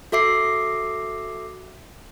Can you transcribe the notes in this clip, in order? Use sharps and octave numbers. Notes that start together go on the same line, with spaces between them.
F#4 A4 E5 D6 C7